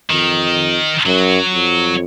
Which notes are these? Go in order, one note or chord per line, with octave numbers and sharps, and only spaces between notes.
F2 D#3
F#2 F#3
F2